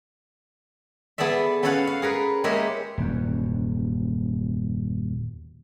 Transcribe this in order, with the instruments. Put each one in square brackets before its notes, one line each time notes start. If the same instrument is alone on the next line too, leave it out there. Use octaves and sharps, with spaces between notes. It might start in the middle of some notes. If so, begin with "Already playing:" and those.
[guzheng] B3 G#4 A4 D5 E5
B3 C#4 A4 C#5 F5 F#5
F5
G#4 A#4 B4
G#3 A#3 G4 A#4 C#5 E5
[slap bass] D#1 F#2